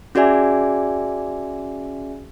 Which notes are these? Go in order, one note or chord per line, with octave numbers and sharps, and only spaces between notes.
C#4 F#4 G#4 D5 E5 G#5